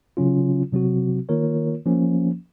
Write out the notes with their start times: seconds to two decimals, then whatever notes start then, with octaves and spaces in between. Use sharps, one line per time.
0.17 C#3 F#3 C#4 F4
0.72 C3 F#3 C4 F#4
1.29 D#3 A#3 F4 A#4 C#5
1.86 F3 A#3 C#4